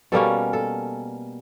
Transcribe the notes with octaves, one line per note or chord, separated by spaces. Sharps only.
B2 G3 A#3 C#4 A4
A4